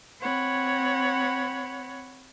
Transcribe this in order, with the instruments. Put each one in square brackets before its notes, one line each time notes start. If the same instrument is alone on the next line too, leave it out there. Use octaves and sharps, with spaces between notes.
[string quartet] C4 C#5 F#5 B5